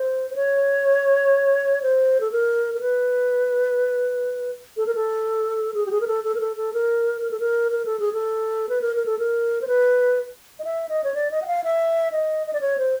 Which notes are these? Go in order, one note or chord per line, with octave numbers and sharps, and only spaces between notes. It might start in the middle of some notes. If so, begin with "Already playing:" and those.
Already playing: C5
C5
C#5
C5
A4
A#4
A#4
B4
A4
A#4
A4
G#4
G4
G#4
A#4
A4
A4
A#4
A4
A4
A#4
A#4
A4
A#4
A#4
A4
G#4
A4
B4
A#4
A#4
A4
A#4
C5
B4
D#5
E5
D#5
C#5
D5
D#5
F#5
F5
E5
D#5
D#5
D5
C#5
C5